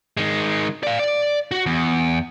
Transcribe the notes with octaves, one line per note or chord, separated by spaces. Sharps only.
D#3 G#3
D5 F5
D5
F#4
E2